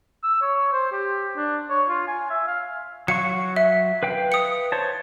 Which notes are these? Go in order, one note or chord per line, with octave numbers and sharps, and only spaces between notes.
E6
C#5
C5
G4
D4
C#5
F4
G#5
E5
F5
F#3 F5 C#6 C#7
E5
B4 F5 G5
D#6 C#7
C5 C#5 A5